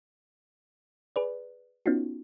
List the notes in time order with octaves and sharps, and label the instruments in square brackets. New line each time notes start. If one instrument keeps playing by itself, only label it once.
[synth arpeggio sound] G#4 B4 D5
B3 C#4 D#4 F4 F#4